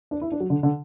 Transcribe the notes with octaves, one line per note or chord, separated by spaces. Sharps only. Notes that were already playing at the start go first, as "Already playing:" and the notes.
D4
E4
D4
F#3
D3
D3